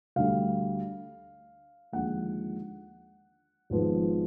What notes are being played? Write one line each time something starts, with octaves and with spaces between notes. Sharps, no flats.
D2 D3 G3 F5
D#2 D3 F3 G#3 F#5
G#1 G#2 F3 G#3 B3